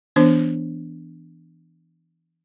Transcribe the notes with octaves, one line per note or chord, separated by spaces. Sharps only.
E3 B3 D4 C5